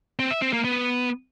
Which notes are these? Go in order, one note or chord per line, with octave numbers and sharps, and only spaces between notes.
C4
E5
C4
A#3
B3